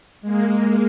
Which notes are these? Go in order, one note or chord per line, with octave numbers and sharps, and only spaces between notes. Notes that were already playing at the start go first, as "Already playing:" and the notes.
G#3 A#3